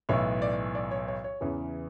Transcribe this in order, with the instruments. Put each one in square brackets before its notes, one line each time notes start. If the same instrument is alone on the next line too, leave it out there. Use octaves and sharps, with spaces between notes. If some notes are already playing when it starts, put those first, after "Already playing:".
[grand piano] B1 A2 E3 B3 C#5
D5
D5
C#5
C#5
C#5
E2 C#3 E3